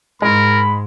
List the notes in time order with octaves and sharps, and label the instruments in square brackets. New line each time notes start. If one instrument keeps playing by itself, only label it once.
[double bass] G#2 [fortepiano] G#3 [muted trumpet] A#4 [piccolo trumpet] B5